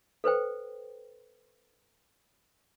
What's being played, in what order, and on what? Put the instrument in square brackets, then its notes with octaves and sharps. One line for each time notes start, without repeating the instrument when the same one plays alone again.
[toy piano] A4 B4 C5 G5